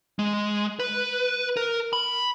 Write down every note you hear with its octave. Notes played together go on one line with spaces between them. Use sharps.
G#3
B4
A#4
B5